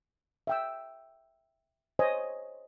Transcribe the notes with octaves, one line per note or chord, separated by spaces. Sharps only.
E5 G5 E6
C5 C#5 D#5 G#5